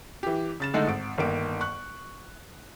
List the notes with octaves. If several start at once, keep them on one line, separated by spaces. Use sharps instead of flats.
E3 G4
C#3 A6 E7
D3 G#3 A3 D#4
G#1 D7
G1 D#3 A#3 D7
C#6 F#6